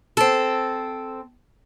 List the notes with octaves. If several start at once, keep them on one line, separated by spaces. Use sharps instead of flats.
C4 A4